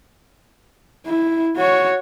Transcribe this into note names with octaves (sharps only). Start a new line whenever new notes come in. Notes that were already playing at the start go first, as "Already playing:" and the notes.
E4
F#4 C#5